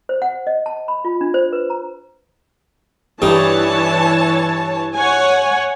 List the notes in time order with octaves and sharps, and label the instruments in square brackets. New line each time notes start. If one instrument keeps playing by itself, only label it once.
[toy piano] C5
F#5
D#5
A5
B5
F4
D4
C5
B4
A#5
[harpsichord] G2 G3 D#4 [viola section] E3 C#5 A5
[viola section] C#5 F#5 G#5